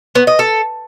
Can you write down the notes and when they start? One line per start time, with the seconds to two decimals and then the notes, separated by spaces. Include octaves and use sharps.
0.15 B3
0.27 D#5
0.39 A4